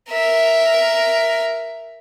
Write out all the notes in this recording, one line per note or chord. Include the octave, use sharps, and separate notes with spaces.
A#4 E5